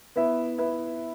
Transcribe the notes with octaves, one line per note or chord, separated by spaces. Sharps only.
B3 E4 B4 E5
B3 E4 B4 E5